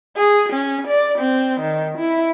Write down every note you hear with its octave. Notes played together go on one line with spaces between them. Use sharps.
G#4
C#4
D5
C4
D#3
E4